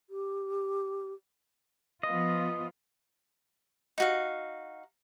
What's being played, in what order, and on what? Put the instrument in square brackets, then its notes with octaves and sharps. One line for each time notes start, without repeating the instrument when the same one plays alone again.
[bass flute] G4
[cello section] F3 B3 F4 [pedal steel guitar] D#5
[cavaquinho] D#4 F#4 F5